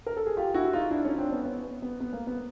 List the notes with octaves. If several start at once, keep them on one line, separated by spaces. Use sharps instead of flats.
A#4
A4
G#4
F4 G4
E4 F#4
D#4 F4
D4 E4
C#4 D#4
C4 D4
B3 C#4
B3
B3
B3
B3
A#3
B3